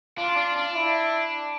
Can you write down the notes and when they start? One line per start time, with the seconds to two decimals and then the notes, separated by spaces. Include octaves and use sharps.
0.18 D4 F4
0.37 D4
0.56 D4
0.74 E4